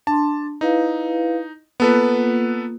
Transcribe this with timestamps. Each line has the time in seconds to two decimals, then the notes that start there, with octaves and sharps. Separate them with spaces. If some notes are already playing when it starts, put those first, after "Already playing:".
0.07 D4 A5 C6
0.61 D#4 E4 B4 F5
1.80 A#3 B3 F4 A4 B4